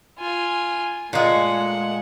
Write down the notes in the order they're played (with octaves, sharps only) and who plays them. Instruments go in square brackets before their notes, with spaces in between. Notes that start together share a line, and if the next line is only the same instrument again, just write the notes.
[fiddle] F4 G#5
[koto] A#2 G#3 [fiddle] A3 F#5